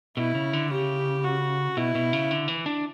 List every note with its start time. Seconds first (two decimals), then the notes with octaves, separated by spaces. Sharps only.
0.17 B2 E4
0.35 C#3
0.53 D3
0.70 C#3 G4
1.24 F#4
1.77 B2 E4
1.95 B2
2.13 C#3
2.31 D3
2.48 E3
2.66 D4